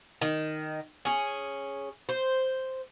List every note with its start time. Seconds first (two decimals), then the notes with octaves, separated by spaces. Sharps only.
0.21 D#3
1.05 C#4 G#4
2.09 C5